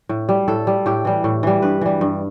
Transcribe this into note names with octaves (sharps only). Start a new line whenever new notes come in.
A2
G3
A2 A4
G3
A2 G4
E3 G3
A2
E3 G3
G2 B4
E3 G3
G2